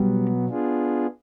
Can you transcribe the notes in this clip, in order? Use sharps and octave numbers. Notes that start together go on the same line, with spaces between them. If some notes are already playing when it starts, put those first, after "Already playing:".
Already playing: B2 F#3 G3 B3
B3 D4 F4 G#4